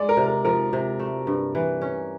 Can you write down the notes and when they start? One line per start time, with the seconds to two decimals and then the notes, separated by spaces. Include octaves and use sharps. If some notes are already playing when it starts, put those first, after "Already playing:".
Already playing: G#3 D5
0.09 A#4
0.17 C3
0.27 A#4
0.45 F3 A#4
0.73 C3
0.99 A3
1.27 G2
1.55 E3
1.82 C#4